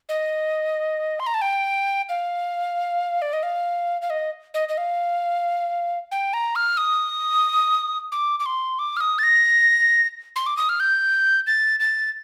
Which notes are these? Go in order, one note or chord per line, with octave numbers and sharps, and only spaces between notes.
D#5
C6
A#5
A5
G5
F5
D5
D#5
F5
F5
D#5
D#5
D#5
F5
G5
A#5
F6
D#6
D6
D6
C6
D6
F6
D#6
A6
A#6
C6
D6
D#6
F6
G6
A6
A6